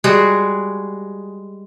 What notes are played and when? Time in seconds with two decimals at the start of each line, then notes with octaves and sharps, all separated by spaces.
0.04 G3 G#3 F#4 G#4